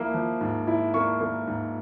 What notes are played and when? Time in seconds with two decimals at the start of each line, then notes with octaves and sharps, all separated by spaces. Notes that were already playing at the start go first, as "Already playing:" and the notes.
Already playing: F3 A#3 E4
0.14 F3
0.41 G#2
0.67 E4
0.94 A#3 C#6
1.21 A#3
1.47 G#2